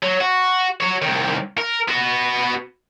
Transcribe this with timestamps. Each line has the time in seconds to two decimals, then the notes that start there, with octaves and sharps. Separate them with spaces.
0.03 F#3
0.21 F#4
0.81 F#4 C#5
1.02 C2 D#3
1.58 A#4
1.88 B3 F#4